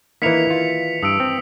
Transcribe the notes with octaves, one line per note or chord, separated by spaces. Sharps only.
D#3 E3 A#3 E4 A#4 B6 C#7 F7
F4
G2 D#6 E6 D7
C4